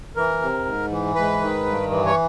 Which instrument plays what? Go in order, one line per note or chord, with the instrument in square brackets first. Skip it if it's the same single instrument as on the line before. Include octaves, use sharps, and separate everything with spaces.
[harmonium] E3 A#4
C3
G#2
E3
G#2 B4
D#3
G2
E3
C#5